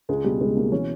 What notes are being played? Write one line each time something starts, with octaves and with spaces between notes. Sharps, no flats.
C#2 G#3
B2 G3
C#2 G#3
B2 A#3
E3 C#4